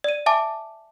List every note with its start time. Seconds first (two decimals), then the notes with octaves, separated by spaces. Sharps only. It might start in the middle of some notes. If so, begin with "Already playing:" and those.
0.04 D5 D#7
0.26 E5 G#5 A5 D6